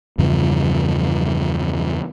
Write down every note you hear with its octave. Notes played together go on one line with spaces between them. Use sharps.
E2 G2 C#3 F3